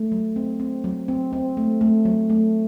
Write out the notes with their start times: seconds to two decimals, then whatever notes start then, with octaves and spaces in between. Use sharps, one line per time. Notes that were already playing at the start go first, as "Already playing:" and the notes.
Already playing: A3
0.12 F#3
0.36 C4
0.60 C4
0.84 F#3
1.08 C4
1.33 C4
1.57 A3
1.81 A3
2.05 F#3
2.30 A3